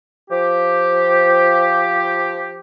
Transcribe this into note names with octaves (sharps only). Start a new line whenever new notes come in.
F3 G4